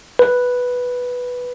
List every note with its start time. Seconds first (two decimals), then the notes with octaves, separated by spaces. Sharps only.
0.19 B4